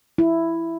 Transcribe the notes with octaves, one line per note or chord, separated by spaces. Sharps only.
E4